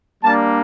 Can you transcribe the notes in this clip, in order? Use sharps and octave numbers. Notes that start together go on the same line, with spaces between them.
G3 A#3 D4 A5